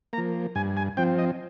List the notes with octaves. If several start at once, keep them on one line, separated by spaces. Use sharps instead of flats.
F3 A#3 A#5
G2 G#5
G#5
F3 C4 G5
D#5